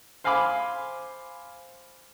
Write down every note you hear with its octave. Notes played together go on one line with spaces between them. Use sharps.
C5 F5 G#5 B5 D6